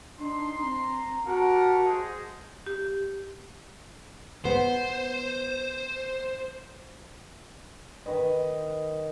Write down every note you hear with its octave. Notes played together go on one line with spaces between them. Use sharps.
D4 D#4 C6
C4 A#5
F#4 G4 A#4 F#5 A5
G#4 C5 D#5
G4
B3 C5
D#3 B4 D#5